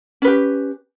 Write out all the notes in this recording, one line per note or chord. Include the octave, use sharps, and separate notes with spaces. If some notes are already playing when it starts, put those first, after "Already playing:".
C#4 G4 B4